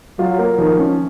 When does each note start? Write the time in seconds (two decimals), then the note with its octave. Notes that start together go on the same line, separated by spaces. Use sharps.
0.18 F#3 F4
0.39 A#3
0.58 D#3 F3
0.78 C#4